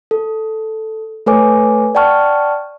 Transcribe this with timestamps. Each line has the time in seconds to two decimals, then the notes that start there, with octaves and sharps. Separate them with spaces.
0.11 A4
1.26 A3 A4 B4 C#5 G#5 D6
1.95 D5 F#5 G5 A5 C#6 F6